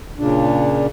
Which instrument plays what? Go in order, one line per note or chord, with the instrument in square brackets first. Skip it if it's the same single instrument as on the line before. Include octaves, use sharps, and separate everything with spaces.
[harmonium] A#2 C#3 D4